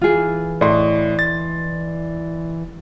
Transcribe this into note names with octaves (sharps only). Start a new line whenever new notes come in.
E3 F4 G#4
A2 D5 D#5 C6
A6